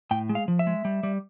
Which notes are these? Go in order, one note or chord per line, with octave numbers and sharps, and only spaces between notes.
A2 G5
G#3
F5
F3
E5
G#3
G3
G3